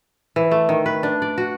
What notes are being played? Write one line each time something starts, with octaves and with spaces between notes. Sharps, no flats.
E3
A3
D#3
B4
D4
D5
F#4